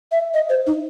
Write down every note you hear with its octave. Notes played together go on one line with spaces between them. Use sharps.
E5
D#5
C5
D#4